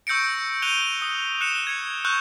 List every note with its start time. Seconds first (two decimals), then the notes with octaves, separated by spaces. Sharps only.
0.07 C#6 E6 G6 A#6 C#7 D7
0.62 F#6 G6 D#7 F7 G7
1.02 D#6
1.41 F#6 C#7 E7 G7
1.67 G#6 C#7
2.05 C#6 E6 F#6 G6